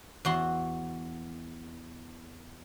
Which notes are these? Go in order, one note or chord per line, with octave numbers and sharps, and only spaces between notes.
E2 F#4 C6